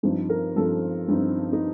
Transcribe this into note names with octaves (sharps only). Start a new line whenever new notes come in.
G2 F3 C4 D#4
A#4
G2 F3 C4 D#4 A4
G2 F3 C4 D#4
D#4